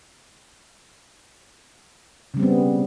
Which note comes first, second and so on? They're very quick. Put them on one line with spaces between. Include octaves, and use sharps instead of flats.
C#3 G3 C4 B3